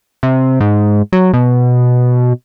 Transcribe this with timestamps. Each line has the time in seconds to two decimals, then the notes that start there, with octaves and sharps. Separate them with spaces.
0.23 C3
0.60 G#2
1.12 F#3
1.34 B2